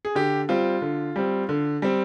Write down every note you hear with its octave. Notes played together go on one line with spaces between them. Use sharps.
G#4
D3 G4
G3 C4 F4
D3
G3 C4
D3
G3 C4